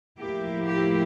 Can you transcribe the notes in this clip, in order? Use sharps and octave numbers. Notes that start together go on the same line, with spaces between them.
A2 F3 A#3 E4 G4
G4